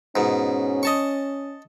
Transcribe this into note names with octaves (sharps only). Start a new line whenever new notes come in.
G#2 B2 C#4
D#5 A5 C#6